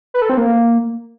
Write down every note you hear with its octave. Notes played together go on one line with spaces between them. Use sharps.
B4
A4
C4
A#3